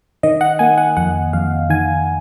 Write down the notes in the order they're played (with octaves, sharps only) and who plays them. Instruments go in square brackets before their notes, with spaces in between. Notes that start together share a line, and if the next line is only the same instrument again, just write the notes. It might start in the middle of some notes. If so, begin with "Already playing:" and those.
[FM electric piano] D#3 D#5
F#5
A#3 G#5
F#5
F2 F#5
F2 F5
D#3 G#5